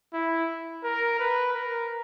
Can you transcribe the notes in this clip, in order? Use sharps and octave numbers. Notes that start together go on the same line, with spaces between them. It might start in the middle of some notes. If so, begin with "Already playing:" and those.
E4
A#4
B4
A#4